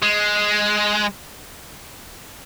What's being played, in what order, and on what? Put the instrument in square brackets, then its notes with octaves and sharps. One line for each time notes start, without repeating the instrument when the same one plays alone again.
[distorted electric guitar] G#3